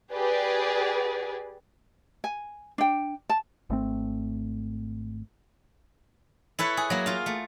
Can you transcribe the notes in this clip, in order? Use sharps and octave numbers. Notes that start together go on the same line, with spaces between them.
G4 G#4 B4 D5
G#5
D4 G5
A5
G#1 A3 C4
E4 A4 B4 C#5
G#4
F#3 A#3
F4 F5
A3